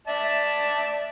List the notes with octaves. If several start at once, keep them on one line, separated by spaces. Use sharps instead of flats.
D5 E5 A5